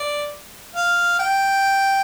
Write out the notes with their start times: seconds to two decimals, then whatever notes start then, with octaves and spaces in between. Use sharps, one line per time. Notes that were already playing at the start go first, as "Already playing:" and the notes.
Already playing: D5
0.76 F5
1.19 G5